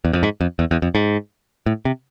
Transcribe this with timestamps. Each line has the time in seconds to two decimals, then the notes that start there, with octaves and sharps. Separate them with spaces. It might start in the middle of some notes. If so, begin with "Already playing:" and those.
0.05 E2
0.13 F2
0.23 G#2
0.41 F2
0.59 E2
0.71 E2
0.82 F2
0.95 G#2
1.66 A2
1.85 C3